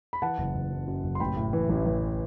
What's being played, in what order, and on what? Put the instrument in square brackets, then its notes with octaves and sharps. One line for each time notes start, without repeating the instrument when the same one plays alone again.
[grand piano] B5
E3 F#5 A5
F#1
F#1
F#2
F#2
F#1
C6
A1 G5 B5
A2
E3
A1
A1